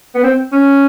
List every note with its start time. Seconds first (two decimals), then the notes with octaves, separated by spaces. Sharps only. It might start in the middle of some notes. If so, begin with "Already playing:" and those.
0.14 B3
0.23 C4
0.52 C#4